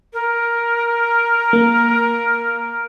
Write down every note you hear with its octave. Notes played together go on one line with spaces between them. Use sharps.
A#4
A#3